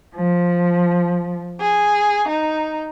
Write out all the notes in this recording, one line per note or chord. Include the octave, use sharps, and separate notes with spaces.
F3
G#4
D#4